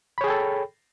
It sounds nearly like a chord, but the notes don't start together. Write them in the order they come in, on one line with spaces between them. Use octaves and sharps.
B5 C#5 G#4 G5 A4